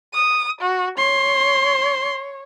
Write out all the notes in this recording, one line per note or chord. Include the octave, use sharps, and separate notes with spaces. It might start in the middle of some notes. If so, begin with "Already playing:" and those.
D#6
F#4
C#5 C6